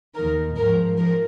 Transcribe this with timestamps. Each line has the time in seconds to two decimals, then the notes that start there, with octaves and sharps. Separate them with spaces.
0.15 D#2 D#3 A#4
0.56 G#2 F3 A#4
0.97 F3 A#4